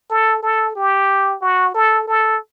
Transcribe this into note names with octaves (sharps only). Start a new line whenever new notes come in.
A4
A4
G4
F#4
A4
A4